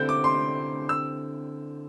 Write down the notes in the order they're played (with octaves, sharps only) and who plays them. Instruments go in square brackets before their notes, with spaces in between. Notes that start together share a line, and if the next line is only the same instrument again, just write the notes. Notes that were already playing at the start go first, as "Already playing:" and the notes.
Already playing: [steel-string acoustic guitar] D3 C4 E4 G4 [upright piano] G6
[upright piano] D6
C6
E6